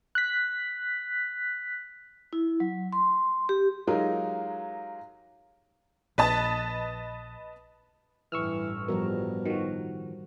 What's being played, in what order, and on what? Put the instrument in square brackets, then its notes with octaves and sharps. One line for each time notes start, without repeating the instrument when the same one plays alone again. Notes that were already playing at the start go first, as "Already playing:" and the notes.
[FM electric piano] F#6 B6
[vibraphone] E4
F#3
C6
G4
[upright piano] F#3 G#3 D#4 F4 G4 A#4
[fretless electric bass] A#1 [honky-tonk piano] B4 D#5 A5
[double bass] A1 G2 [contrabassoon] E3 [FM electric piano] C#6 E6 F6
[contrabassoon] B2 [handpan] F3 G3 A#4
[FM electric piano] D#3 F3 [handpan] F#4